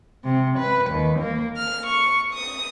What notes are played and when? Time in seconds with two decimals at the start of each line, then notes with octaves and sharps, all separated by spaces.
0.24 C3
0.57 B4
0.91 D#2
1.20 A#3
1.55 F6
1.85 C#6
2.32 D#6